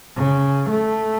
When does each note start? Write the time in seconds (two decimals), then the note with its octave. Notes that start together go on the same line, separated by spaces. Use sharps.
0.16 C#3
0.70 A3